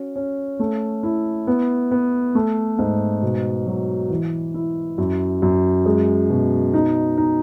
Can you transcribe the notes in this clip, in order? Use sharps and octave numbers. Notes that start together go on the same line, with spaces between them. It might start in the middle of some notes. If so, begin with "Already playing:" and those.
Already playing: C#4 F#4
C#4
A3
E4
B3
B3
A3
G#2
B2
F#3
E3
E4
F#2
F#2
G#3
B2
D#4
D#4